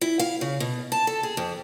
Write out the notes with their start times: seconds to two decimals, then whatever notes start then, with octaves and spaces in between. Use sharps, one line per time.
0.01 E4
0.19 F5
0.41 C#3
0.60 B2
0.92 A5
1.07 A4
1.23 G#4
1.37 F2